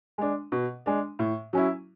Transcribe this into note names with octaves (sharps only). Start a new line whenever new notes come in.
G#3 D4
B2
G#3 D4
A2
F#3 C#4 E4